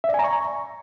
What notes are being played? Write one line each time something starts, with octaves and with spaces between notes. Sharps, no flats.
E5
D5
G#5
A#5
C#6